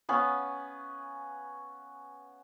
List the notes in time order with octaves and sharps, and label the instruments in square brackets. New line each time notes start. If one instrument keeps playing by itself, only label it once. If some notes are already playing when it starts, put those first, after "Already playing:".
[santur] B3 C#4 F5